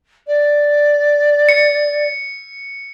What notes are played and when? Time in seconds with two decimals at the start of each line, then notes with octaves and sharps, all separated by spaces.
0.27 D5
1.49 C#7